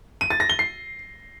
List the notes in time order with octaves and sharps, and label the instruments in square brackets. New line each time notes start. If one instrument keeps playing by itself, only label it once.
[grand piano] D#7
A6
A#6
G7
C7